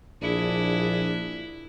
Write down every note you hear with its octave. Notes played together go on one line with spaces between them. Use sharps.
A#1 D4 E4 G#4